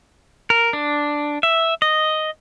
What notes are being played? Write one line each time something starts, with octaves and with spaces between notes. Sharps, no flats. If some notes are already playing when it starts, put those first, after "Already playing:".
A#4
D4
E5
D#5